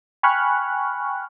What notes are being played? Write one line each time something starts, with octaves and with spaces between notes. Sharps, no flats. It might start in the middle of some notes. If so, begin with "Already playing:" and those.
G5 G#5 B5 C#6 F6 F#6